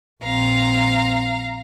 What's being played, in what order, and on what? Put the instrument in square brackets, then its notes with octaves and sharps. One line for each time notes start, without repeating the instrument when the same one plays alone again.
[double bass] A#1 C4 [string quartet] F5 A#5